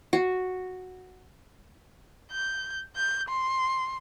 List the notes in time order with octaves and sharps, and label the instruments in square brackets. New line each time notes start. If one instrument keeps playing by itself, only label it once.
[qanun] F#4
[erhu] G6
G6
C6